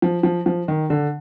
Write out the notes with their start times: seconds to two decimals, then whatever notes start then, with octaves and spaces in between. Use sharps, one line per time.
0.02 F3
0.23 F3
0.46 F3
0.68 D#3
0.90 D3